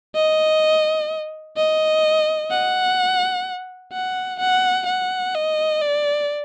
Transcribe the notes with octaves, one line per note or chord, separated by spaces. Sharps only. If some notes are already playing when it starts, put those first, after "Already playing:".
D#5
D#5
F#5
F#5
F#5
F#5
D#5
D5